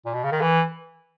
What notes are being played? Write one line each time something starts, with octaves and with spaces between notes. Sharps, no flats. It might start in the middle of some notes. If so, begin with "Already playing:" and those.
A#2
B2
C#3
D#3
E3